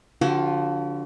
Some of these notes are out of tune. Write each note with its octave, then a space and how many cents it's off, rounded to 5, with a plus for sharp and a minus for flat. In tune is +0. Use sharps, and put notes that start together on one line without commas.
D3 -20 F3 +15 F#4 +40